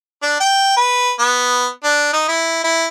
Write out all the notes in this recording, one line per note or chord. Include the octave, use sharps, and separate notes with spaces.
D4
G5
B4
B3
D4
D#4
E4
E4